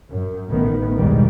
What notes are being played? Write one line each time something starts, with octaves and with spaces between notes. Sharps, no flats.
F#2
A1 D#3 B3
B1 E2 G#2 D#3 G3